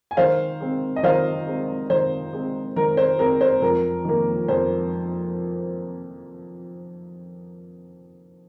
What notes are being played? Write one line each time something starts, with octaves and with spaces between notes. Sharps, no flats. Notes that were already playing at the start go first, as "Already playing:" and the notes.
G#5
D#3 C5 F5
G#3 C4
D#5
D#3 C5 F5
G#3 C4
D#3 C5
G#3 C4
D#3 A#4
C5
G#3 C4 A#4
C5
F2 A#4
D#3 A#3
F2 C5